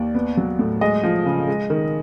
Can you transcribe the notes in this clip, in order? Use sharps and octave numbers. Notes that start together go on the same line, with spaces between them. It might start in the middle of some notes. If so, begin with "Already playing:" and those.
Already playing: D#2 D5
B3
F#3
A2
G#3 D#5
F3
C#3
G#3
D#3